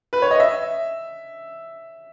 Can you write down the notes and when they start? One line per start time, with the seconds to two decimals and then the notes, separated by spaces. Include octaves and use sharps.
0.13 B4
0.22 C#5
0.31 D#5
0.40 E5